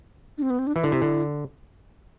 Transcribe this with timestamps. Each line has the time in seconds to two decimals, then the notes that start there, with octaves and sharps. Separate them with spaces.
0.38 D4
0.42 C4
0.50 B3
0.59 C4
0.67 D4
0.75 E3 E4
0.84 D3
0.92 C3
1.02 D3